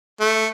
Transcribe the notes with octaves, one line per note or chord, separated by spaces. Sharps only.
A3